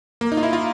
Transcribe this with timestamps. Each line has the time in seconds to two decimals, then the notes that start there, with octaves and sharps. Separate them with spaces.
0.21 A#3
0.32 D#4
0.37 F4
0.43 E4
0.53 F4